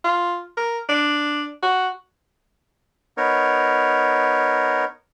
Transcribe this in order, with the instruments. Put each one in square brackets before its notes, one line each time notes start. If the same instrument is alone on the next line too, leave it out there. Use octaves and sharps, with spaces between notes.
[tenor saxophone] F4
A#4
D4
F#4
[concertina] B3 D#4 A#4 C#5